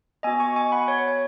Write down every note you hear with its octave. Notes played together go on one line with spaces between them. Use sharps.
B3 F#4 D#5 G#5
G#5 C#6
G#5 C#6
F#5 B5
C#5
C#5